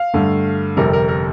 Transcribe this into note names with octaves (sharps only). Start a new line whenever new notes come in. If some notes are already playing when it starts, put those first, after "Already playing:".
Already playing: F5
G2 D3 A3
G1 F2 C3 G3 A#4
A#4
A#4